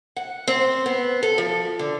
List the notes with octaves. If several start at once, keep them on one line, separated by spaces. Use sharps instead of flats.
F#5
C4
B3
A4
F3
D3